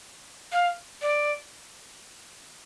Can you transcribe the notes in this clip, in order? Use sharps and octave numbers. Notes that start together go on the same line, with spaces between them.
F5
D5